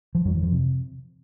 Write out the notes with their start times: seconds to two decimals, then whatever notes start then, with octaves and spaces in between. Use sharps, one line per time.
0.15 F3
0.25 F2 F#3
0.35 E3
0.43 F3
0.53 C3